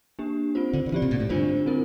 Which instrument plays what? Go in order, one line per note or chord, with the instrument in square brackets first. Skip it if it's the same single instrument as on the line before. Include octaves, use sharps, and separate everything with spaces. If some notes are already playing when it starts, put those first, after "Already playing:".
[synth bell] A#3 D4 G4
C4 F4 C5
[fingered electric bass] D3
D3
[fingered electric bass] E3 [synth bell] C4 G4 D5
[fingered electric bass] C3
A#2
A2
[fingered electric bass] G2 [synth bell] D3 A3 D4 F4 C5
[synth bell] C4 E4 A#4